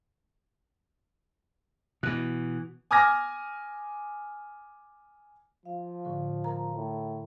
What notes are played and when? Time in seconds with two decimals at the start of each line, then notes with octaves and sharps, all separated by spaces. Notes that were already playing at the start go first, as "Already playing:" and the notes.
2.03 B2 E3 F#6
2.91 G#5 D6 D#6 F6 G#6 A#6
5.65 F3 F5
6.05 A2 D3
6.44 A#4 A#5
6.76 A2